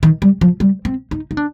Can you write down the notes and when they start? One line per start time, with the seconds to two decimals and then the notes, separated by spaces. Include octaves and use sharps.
0.03 D#3
0.22 G3
0.41 F3
0.60 G3
0.85 C4
1.11 D#4
1.31 D#4
1.37 D4